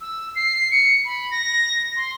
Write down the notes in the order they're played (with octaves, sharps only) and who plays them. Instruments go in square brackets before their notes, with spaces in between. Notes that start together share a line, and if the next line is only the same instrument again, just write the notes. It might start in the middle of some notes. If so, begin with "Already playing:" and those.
[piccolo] E6
C7
C#7
B5
A#6
C6